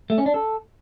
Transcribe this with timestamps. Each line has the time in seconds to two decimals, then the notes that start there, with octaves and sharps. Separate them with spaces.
0.10 A3
0.18 C#4
0.26 D4
0.34 A4